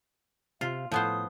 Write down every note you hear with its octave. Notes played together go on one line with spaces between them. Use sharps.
C3 F4 F5
A2 F3 B3 C5 D#6